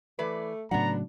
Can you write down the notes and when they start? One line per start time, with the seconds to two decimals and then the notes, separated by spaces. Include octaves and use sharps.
0.19 E3 A3 B4 D5
0.71 A2 C#3 F#3 B3 D4 F#5 A#5